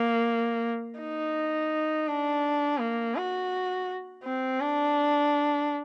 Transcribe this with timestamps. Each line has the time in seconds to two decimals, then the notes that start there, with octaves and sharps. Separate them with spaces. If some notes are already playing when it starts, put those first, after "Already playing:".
Already playing: A#3
1.00 D#4
2.07 D4
2.80 A#3
3.16 F#4
4.24 C4
4.61 D4